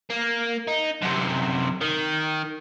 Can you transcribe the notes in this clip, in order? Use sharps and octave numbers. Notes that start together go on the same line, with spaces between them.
A#3
D#4
F#2 C3
D#3